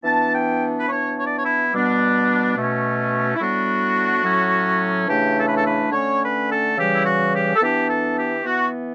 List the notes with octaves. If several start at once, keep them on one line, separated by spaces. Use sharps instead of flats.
E3 B3 D4 A5
G5
B4
E3 B3 D4 C#5
C#5
D5
C#5
E4
B2 G3 B3 D4
B2 A3 C#4
E4
A2 G3 B3 D4 F#4
A2 F#3 C#4
C#3 E3 A3 D4 G4
A4
B4
A4
B4
D3 A3 C#4 C#5
B4
A4
C#3 E3 G3 G4
E4
F#4
G4
A4
E3 B3 D4 G4
A4
G4
E3 B3 F#4